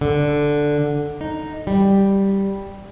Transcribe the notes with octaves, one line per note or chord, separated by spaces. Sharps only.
D3
D#4
G3